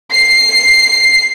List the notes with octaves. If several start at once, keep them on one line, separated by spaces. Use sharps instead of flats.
C7